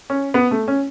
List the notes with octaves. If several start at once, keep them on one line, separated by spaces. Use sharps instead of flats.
C#4
B3
A3
C#4